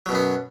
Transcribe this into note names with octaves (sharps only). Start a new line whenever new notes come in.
F#2 B2 F#3 B3